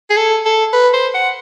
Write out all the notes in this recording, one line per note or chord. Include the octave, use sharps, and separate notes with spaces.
G#4
A4
A4
B4
C5
F#5